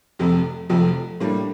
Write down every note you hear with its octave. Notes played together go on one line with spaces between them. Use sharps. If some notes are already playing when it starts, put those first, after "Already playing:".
F1 F2 C3 F3
F1 F2 C3 F3
A2 G3 A#3 D4